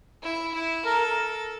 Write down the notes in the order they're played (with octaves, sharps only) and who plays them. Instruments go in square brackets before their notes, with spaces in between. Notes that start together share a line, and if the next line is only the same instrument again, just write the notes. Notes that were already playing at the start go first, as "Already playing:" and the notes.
[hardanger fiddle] E4
E4
[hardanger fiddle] A4 [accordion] A#4